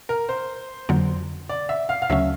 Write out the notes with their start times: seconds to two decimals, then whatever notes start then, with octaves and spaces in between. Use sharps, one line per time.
0.09 A#4
0.29 C5
0.89 F2 D3 F#3 A#3
1.49 D5
1.69 E5
1.89 F5
2.02 F5
2.10 D2 C#3 F#3 A3 C#4 E5